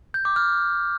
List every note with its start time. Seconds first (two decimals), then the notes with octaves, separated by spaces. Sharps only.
0.14 G6
0.25 D6
0.36 F6